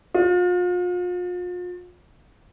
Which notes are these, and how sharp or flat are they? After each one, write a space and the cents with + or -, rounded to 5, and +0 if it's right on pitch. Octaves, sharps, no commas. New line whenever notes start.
F4 +40